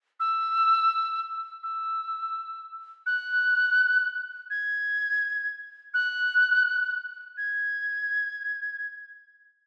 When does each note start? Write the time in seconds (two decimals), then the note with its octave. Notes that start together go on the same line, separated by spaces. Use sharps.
0.20 E6
1.63 E6
3.06 F#6
4.50 G#6
5.94 F#6
7.37 G#6